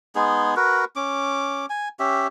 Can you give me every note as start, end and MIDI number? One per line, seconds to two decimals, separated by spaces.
0.15 0.55 56
0.15 0.55 59
0.15 0.55 63
0.15 0.55 68
0.56 0.85 66
0.56 0.85 70
0.56 0.85 71
0.96 1.66 61
0.96 1.66 86
1.70 1.89 80
2.00 2.27 61
2.00 2.27 67
2.00 2.27 76